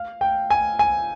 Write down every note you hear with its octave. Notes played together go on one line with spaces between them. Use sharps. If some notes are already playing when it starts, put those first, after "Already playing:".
Already playing: F5
G5
G#5
G#5